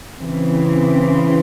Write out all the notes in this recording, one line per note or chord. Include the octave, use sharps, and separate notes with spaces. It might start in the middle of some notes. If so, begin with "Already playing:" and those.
C#3 E3 C4